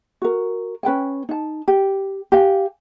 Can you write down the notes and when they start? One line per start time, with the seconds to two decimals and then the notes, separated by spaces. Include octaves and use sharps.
0.22 F#4 A#4
0.83 C#4 B4 G5 G#5
1.29 D#4 A5
1.68 G4
2.32 G4 F5 G#5